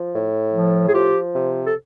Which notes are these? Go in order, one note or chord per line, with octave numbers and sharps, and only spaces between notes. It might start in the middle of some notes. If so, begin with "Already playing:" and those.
Already playing: F3
A2
F3
G#4
F3 F4 G4
C3
A4